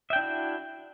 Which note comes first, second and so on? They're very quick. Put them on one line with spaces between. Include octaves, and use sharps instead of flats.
E5 G5 D4 E4 F#4